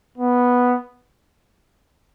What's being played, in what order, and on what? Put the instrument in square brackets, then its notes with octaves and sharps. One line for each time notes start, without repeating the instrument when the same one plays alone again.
[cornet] B3